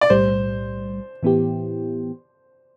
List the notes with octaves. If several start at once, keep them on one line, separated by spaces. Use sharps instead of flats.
D5
B1 A2 G3 C5
A2 E3 B3 E4 G4